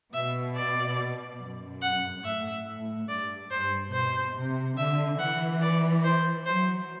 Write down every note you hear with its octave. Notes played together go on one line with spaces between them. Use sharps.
B2 E5
D5
F#2
F#5
A2 E5
A2
G2 D5
G2 C5
B2 C5
C3
D3 E5
E3 F#5
D5
C5
F#3 C5